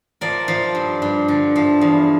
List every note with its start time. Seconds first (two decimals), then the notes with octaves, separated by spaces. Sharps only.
0.21 F3 A#4 D5
0.48 F3
0.75 G2
1.02 G2
1.28 D3
1.56 F3
1.81 E2